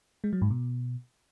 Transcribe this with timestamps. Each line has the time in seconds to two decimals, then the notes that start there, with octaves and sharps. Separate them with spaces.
0.24 G#3
0.33 F#3
0.42 G#2
0.50 B2